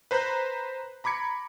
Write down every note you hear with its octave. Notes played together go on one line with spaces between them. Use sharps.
B4 C5 A#5 F#6 G6
A#5 B5 D6 G#6 C#7